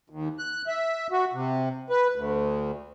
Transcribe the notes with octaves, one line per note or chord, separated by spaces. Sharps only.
D#2
F#6
E5
F#4
C3
B4
D2